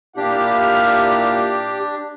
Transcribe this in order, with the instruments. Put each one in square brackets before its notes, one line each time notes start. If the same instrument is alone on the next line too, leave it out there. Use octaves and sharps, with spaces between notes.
[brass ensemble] A#2 E4 F5 [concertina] D4 [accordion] G4